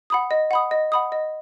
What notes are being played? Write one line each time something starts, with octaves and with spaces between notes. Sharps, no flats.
F#5 B5 D#6
D#5
F#5 B5 D#6
D#5
F#5 B5 D#6
D#5